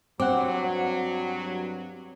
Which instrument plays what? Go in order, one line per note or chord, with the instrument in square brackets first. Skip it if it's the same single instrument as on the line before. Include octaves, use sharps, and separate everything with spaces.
[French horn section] G2 F#3 [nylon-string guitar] C4 [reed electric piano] F#5 D6